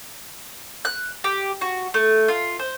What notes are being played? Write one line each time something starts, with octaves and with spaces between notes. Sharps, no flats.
F#6
G4
F#4
A3
F4
C5